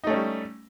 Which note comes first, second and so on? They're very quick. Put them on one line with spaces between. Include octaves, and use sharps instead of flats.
D#4 A3 C#4 G3